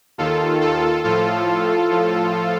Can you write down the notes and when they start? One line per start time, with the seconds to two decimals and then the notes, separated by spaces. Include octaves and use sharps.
0.18 D#2 D#3 F4 A4
0.61 F4 A4
1.04 A2 F3 F4 A4
1.89 A2 F3